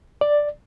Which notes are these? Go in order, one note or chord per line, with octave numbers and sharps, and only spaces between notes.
D5